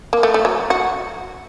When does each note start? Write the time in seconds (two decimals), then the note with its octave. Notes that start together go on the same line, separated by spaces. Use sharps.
0.13 A#3
0.23 A3
0.34 A3
0.45 F#3
0.70 F#4